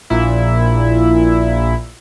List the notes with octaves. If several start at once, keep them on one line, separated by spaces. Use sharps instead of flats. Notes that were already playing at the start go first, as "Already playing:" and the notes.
A#1 A#2 E4